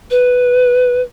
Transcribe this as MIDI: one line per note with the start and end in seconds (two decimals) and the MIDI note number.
0.11 1.01 71